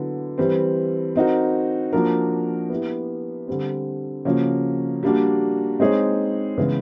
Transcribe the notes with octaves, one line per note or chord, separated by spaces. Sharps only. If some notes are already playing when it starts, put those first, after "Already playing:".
Already playing: D3 F#3 B3 E4
E3 G3 C4
C4 D#4 F#4 A#4
F3 A#3 D4 F#4 A#4
B3 E4 G4
D3 G3 C4
C#3 F3 A#3 C#4 F#4
G3 A#3 D4 F#4
G#3 C4 D#4 G#4 C#5
C#3 E3 G#3 B3